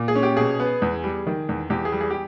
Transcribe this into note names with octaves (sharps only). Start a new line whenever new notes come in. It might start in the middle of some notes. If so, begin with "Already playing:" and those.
Already playing: A#2
G#4
C#4
G4
B2 G#4
B3
E2
G3
D#3
E2
E2 G4
G#4
G3
G#4
G4